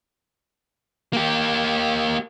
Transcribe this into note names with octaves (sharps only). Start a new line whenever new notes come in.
A#3 G4